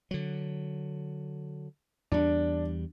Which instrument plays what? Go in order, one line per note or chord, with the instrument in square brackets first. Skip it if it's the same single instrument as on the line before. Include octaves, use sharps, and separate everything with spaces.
[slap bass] D3 F#3
[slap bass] E2 G3 [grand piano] D4